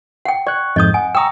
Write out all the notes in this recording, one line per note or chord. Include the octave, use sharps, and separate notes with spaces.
F#5 G5
D5 C#6 F#6
F2 G#2 D#5 D#6 G6
F#5 G#5
G5 A#5 C#6 D#6 E6